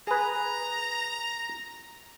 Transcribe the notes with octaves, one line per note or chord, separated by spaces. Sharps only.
G#4 B4 A#5